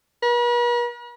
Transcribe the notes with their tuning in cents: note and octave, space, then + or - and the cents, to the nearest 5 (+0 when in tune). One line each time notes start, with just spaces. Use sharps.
B4 -45